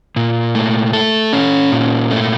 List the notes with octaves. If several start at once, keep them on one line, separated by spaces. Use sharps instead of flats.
A#2
A3
A4
C#4
A#2
A3